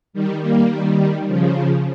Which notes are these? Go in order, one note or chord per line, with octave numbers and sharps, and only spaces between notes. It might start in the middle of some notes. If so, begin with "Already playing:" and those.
D#3 G3
G3 A#3
D#3 G3
C#3 F3